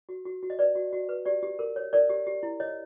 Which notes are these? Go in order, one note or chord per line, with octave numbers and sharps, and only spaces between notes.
F#4
F#4
F#4
D#5
B4 D5
F#4
F#4
B4
G4 D5
G4
A#4
C#5
A#4 D5
G4
G4
E4
C#5 D#5